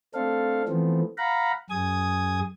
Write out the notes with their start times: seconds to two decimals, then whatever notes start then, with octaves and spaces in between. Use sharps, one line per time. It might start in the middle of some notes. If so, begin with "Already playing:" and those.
0.14 A3 C4 D4 A4 F5
0.68 E3 F3 A3 B3 C4
1.18 F5 F#5 A#5 B5
1.70 F#2 G#4 D#6 G#6